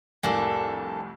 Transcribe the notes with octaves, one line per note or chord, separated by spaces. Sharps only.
C2 F2 A2 A#3 D4 A4 A#4 G#5